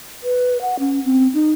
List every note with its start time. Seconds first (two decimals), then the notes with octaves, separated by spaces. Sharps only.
0.23 B4
0.61 F#5
0.80 C#4
1.05 C4
1.34 D#4